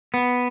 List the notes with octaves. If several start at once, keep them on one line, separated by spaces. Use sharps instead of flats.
B3